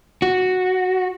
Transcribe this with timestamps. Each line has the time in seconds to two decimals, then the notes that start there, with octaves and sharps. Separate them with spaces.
0.22 F#4